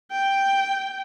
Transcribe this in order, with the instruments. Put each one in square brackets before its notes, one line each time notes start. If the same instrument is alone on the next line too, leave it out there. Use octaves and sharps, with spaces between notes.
[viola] G5